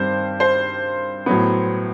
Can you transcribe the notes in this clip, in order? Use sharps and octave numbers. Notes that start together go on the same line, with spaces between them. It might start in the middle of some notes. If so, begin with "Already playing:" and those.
Already playing: G2 D#3 G3 C4 C5
C5
A2 F#3 B3